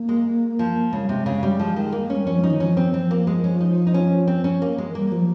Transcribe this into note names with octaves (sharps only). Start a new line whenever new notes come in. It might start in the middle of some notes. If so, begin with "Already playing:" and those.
Already playing: A#3
G#3
F3
C#3 G#3
G3
C3 G#3
C#3
G3
F3
D#3
A#3
G#3 C#4
G3
F3 C#4
D#4
D#3
F3 C#4
C4
F3 C4
A#3
G#3
C#4
D#4
D#4
C#4
C4
C#4
A#3
G#3
F3
G3 A#3
F3